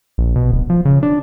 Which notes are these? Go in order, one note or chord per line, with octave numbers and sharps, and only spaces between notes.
A#1
B2
D1
F3
C#3
D4